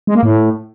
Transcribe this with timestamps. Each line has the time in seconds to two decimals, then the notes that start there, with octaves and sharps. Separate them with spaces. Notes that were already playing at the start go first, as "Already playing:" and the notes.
0.07 G#3
0.15 A#3
0.23 A2